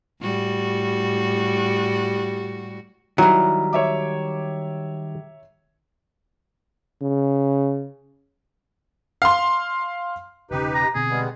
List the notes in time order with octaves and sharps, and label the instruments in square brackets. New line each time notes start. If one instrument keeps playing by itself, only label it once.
[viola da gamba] A2 G3 F#4
[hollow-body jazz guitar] D#3 G3 [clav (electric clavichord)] F#3 [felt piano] E4 [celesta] A#5
[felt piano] C#5 E5 D6
[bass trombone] C#3
[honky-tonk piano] F5 C6
[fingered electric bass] E1 C#3 C#4 [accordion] D#4 G4 B4
[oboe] A#5
[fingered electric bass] B2 D3 C4 [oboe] G#4
[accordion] G3 G#3 B3